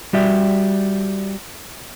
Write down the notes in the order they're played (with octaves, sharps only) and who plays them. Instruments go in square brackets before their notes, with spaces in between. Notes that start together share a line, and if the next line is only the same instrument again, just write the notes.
[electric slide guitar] G3 F#4 G4 D5 E5